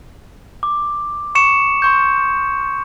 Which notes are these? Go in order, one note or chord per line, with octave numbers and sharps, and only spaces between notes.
D6
C#6 C#7 E7
C6 C#6 G6